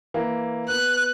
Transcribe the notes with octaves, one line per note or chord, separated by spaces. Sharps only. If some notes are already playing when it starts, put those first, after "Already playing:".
E3 A#3
B3 F#6